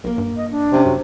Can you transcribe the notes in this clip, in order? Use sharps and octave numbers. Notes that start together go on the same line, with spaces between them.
B1 A#3 A#4
G2
D#5
D4
C3 C4 C#4
F#2 F#3